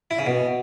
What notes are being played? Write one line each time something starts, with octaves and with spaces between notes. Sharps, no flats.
E4
C#3
B2